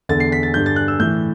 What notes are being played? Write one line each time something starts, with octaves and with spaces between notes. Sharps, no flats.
E2 D3 A6
C7
B6
A6
G2 D3 G6
A6
F#6
E6
A2 E3 G6